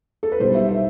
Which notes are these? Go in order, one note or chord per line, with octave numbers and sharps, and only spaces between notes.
A4
B4
B1 B2 G3 C5
E5
E5